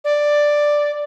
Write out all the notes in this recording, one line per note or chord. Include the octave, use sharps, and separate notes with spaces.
D5